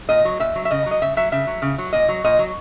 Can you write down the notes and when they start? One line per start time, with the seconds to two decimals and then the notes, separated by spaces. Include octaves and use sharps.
0.09 A#2 D#5
0.25 F#3
0.40 A#2 E5
0.55 F#3
0.65 E5
0.71 C#3 D#5
0.86 F#3
0.91 D#5
1.02 C#3 E5
1.17 F#3 E5
1.32 C#3 E5
1.47 F#3
1.62 C#3
1.78 F#3
1.93 A#2 D#5
2.09 F#3
2.24 A#2 D#5
2.39 F#3